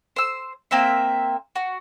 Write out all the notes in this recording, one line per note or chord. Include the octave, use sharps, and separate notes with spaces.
C5 E6
A#3 C4 C5 E5
F#4